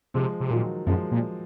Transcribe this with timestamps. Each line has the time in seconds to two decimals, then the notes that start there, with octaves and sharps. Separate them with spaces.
0.14 C3 F3 G#3
0.40 C3
0.50 A#2 D#3 F#3
0.87 F#2 F3 G#3
1.11 A#2